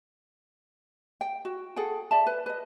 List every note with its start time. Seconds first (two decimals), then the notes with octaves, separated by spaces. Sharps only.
1.21 G5
1.45 F#4
1.76 G#4 A4 F#5 G5
2.11 D5 E5 A5
2.27 B4
2.46 B4 D#5